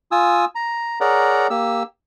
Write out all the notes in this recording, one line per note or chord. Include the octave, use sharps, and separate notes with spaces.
F4 G#5 D#6 E6
A#5
G#4 A#4 C#5 D5 F#5 A#5
A#3 G4 E6